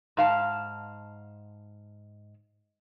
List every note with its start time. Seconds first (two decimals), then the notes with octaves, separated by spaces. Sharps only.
0.17 G#2 F5 A5